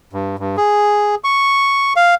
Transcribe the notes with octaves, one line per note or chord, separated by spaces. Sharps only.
G2
G2
G#4
C#6
F5